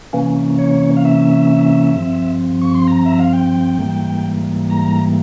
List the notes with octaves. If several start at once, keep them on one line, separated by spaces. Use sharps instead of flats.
C3 E3 A#3 C#4
C#5
F5
E5
G2 F3 C4
C#6
C6
A#5
E5
F5
G5
G#2 E3 G3 A#3
A#5